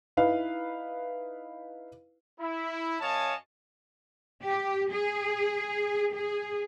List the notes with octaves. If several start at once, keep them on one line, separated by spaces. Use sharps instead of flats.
D#4 E4 B4 F5
E4
F#2 C#5 D#5 F5 G#5 A5
G4
G#4
G#4